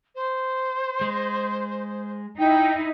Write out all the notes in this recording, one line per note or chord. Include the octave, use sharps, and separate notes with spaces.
C5
G#3
D#4 E4 G5